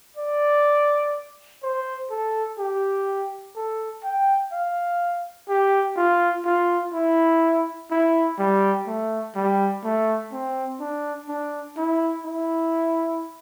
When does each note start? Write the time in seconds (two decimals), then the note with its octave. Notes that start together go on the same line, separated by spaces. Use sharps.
0.17 D5
1.63 C5
2.11 A4
2.58 G4
3.56 A4
4.04 G5
4.53 F5
5.49 G4
5.97 F4
6.45 F4
6.93 E4
7.91 E4
8.39 G3
8.87 A3
9.36 G3
9.84 A3
10.32 C4
10.80 D4
11.28 D4
11.77 E4
12.25 E4